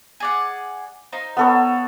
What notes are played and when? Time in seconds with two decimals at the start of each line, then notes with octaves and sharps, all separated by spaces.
0.20 G#4 D5 F#5
1.13 D#4 C5 F5
1.37 B3 A4 C#5